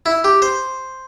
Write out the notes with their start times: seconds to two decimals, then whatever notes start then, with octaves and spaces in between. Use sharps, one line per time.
0.06 E4
0.24 G4
0.42 C5